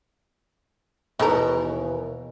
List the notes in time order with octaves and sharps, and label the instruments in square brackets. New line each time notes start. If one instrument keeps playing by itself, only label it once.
[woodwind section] D#2 E3 [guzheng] B2 [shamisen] D#4 A4 A#4